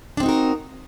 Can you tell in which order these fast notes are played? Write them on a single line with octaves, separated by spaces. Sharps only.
D4 C4 D#4 F#4 A#4